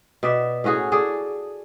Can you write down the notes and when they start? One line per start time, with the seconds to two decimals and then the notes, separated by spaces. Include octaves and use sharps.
0.23 B2 D5 E5
0.64 A2 C#4 F#4 G#4
0.92 G#4 A4 D5